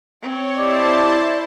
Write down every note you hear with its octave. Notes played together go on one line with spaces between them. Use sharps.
C4 C#5
E4 G4 C5 D5 D#5 A5 D6